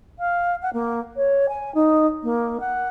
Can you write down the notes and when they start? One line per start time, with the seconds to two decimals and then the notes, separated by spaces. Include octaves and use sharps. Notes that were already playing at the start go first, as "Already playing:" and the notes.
0.19 F5
0.62 F#5
0.73 A#3
1.16 C#5
1.48 G#5
1.74 D#4
2.23 A#3
2.60 F#5